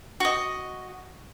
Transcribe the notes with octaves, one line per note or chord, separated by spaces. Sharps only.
F#4 D#5